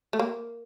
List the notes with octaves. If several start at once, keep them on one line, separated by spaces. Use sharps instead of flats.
A3
A#3